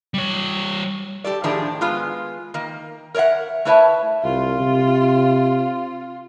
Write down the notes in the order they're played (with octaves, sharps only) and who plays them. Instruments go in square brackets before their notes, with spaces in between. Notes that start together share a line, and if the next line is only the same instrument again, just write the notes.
[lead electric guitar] G3 C#5
[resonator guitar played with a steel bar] G4 A4 D5
A2 D#3 F3 D4 G4 G#4
G#3 B3 F4
D#3 A#3
A#4 C#5 D5 E5 F#5
A3 E4 B4 C#5 E5 A5
[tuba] C2 [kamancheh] F4
[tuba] C3